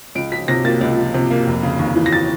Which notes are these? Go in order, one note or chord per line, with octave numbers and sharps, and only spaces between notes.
C#2 D7
F3 B6
C3 A#6
A#3 A6
C#2
F3
C3
A#3
F1
C#3
D#2
E3
A#6
A6